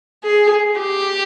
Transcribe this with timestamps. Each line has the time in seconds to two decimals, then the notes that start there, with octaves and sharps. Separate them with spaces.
0.24 G#4
0.81 G4